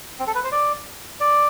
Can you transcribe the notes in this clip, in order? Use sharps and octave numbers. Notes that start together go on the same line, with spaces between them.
C4
A4
B4
C5
D5
D5